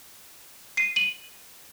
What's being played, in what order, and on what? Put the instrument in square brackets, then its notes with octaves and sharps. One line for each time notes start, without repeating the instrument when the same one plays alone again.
[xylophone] C7 D#7
D#7 F#7